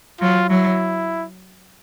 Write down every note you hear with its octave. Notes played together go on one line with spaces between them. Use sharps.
F#3 F4
F#3 E4